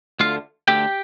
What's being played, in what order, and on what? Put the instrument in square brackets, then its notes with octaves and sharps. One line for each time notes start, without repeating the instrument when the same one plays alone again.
[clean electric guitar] D2 D3 A3 F4 F5
D2 D3 A3 G4 G5